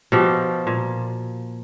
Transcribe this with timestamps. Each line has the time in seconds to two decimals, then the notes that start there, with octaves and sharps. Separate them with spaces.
0.12 B2 F3 G4
0.67 A#2